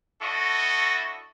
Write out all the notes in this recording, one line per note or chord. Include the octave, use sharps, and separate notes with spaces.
D4 E4 F#4 A4 D#5 C#6